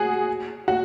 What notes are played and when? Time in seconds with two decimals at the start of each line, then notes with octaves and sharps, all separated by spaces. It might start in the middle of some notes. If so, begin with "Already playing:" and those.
Already playing: F#4 G#4
0.68 F#4